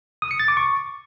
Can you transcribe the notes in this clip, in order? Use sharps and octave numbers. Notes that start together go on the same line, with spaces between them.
D#6
C#7
A6
D6
C#6